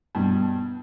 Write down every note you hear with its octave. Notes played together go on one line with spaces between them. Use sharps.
G2 B2